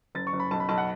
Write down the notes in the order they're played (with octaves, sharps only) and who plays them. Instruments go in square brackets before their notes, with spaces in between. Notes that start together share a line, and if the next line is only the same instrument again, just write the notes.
[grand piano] F#1 A6
C#6
F#1
B5
B1 A5
B5
B1 A5
F#5